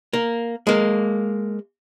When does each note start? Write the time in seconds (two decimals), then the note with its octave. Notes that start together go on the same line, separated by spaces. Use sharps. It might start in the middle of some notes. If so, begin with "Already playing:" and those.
0.13 A#3
0.67 G#3 A#3